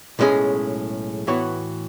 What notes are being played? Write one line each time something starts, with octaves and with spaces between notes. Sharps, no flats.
B1 A2 G#3 C#4 G#4
A2 E3 B3 F#4 C#5